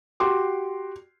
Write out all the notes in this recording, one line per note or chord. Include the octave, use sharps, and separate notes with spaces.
F#4 G4 C6 D6